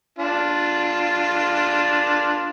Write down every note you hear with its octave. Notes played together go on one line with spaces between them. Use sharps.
D4 F4